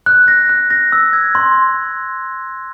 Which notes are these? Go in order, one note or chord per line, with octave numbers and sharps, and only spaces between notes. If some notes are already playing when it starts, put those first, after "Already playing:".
F#6
A#6
F#6
A#6
E6
G#6
C6